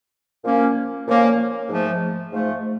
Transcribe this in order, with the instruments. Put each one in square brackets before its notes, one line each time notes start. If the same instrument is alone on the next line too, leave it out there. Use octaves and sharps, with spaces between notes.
[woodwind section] A#2 F3 A#3 C#4
A#2 F3 A#3 C#4
G#2 F3 A3
G#2 F3 A3